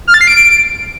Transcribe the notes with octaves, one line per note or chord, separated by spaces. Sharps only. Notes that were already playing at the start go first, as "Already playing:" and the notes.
F6
A6
C7
D7